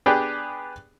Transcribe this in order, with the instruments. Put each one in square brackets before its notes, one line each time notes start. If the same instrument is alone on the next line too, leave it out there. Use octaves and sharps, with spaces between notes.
[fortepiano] B3 D4 G4 G#4 D5 G5